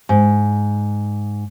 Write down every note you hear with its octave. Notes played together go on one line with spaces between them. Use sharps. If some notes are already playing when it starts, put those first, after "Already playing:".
G#2